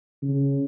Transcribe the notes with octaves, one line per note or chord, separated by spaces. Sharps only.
C#3